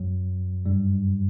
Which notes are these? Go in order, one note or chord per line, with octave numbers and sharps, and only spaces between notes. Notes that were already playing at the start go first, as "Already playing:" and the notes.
Already playing: F#2 F#3
G2 G3